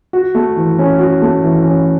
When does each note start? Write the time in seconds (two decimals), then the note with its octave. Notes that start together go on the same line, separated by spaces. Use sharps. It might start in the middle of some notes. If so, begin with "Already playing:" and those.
0.13 F#4
0.35 A3
0.56 E3
0.78 C#4
0.99 F#4
1.22 A3
1.43 E3
1.64 C#4